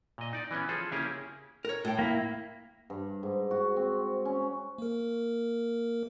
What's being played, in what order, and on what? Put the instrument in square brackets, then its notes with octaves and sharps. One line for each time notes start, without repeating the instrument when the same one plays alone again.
[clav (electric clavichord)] A#2 D#5
D#4 D5
E3 B3 C#4
F3 G#4 A4
C#3 A#3 C#4 E4 G4 G#4
[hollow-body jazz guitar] A#4 C#5
A2 G5
[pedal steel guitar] A#3 E4
[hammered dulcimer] G2
G#2
F#4
C4
C#4
[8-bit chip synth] A#3 A#4